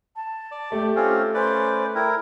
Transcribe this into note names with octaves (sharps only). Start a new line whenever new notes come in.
A5
D5
A3 G4
C4 C#4 F4
C#4 B4 C5 D5
E4 A#4 G5